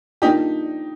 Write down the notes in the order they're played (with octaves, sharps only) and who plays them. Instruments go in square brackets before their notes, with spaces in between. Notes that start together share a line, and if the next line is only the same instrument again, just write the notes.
[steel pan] A#3 D4 F4 [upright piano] D#4 G4